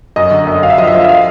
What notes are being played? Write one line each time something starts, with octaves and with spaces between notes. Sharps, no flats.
F#2 D#5
D3
F#2
F#2 F5
E5
F3 D#5
E5
F3
E5
F5